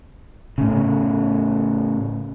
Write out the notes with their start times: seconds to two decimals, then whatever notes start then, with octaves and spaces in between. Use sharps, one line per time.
0.58 A2 C#3